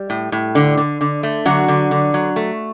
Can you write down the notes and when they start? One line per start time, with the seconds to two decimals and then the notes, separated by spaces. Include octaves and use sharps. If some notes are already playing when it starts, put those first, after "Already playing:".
Already playing: G3
0.10 A2
0.32 A2
0.55 D3
0.77 D3
1.01 D3
1.23 A3
1.46 D3 F#3 F#4
1.68 D3
1.91 D3
2.14 F#3
2.36 A3